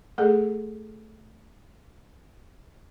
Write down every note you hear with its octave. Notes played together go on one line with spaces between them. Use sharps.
A3 G#4 A4